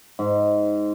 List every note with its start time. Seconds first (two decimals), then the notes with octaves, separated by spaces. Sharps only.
0.19 G#2